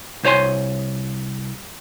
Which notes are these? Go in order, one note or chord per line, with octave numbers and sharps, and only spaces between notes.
C2 C5 C#5 G#5 C6